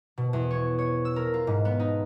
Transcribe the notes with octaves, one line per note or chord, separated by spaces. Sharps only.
B2
E2
C#5
C#5
E6
A#4
F4
G#2
B3
D#4